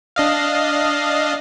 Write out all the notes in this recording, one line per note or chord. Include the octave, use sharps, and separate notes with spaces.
D4 D#5 F5